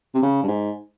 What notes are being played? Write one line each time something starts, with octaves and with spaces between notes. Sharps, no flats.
C3
C#3
G2
G#2